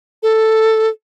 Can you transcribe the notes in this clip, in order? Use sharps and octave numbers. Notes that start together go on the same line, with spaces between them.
A4